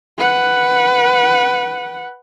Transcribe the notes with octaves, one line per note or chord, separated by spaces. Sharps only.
B4 F#5